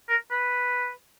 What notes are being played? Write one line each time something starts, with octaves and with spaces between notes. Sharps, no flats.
A#4
B4